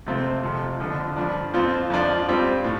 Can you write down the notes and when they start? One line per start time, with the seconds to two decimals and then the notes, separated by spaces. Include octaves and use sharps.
0.07 F2 C3 A3 C4 F4
0.43 F2 C3 F3
0.80 F2 D3 F3
1.16 G2 F3 D4
1.54 F2 F3 C4 F4
1.90 F2 F3 D4 F4
2.28 G2 G3 C4 F4
2.64 A2